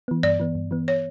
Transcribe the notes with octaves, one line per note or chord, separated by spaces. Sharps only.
E3 B3
G2 D5
E3 B3
G2
E3 B3
C#5